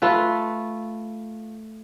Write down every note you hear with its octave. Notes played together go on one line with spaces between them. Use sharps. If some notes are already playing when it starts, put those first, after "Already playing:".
A3 F4 B4